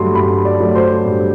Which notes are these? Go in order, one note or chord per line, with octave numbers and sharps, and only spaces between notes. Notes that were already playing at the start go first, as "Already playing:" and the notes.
Already playing: G2 F#3 A3 C6
G2 B5
D5
F#3 A3
C5
G2